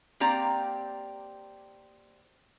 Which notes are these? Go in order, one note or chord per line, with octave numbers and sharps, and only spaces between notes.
A#3 C4 G4 D5 A#5